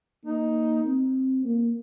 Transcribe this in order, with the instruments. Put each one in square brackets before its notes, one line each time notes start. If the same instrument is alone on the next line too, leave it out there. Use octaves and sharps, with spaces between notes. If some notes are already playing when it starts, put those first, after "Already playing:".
[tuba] A#3 [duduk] D#4
[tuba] C4
A#3